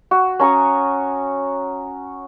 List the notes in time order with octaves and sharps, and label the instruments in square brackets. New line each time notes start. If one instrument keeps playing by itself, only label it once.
[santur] F#4
C#4 A#5 C#6 D#6